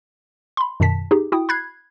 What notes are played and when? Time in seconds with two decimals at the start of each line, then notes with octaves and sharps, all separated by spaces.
0.57 B5 C6
0.80 F#2 B2 D#3 A5 B6
1.11 D#4 G4 G#4
1.32 E4 F#4 G5 D#6
1.49 B5 F#6 G#6 C7